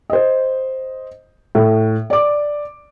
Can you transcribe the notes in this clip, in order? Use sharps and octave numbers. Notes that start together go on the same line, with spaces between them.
C5 D#5
A2
D5 D6